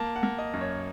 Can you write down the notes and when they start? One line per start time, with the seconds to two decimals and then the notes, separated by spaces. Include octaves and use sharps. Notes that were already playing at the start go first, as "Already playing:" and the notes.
Already playing: A#3 A5
0.16 F#5
0.23 A#3
0.39 D#5
0.53 F#2
0.61 C#5